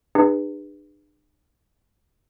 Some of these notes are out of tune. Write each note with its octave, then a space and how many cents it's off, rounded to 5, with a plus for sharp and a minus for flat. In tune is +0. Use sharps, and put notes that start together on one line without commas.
D4 +45 G#4 -40 B4 +0